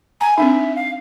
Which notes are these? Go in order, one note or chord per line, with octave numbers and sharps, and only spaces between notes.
G#5 A#5
C4 D4 D#4 E5
F5